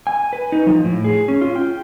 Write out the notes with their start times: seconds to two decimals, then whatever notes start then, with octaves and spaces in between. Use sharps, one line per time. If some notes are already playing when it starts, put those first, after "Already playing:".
0.07 G#5
0.33 B4
0.52 D#4
0.67 F3
0.84 A2
1.04 G#4
1.28 C#4
1.41 F4
1.56 G5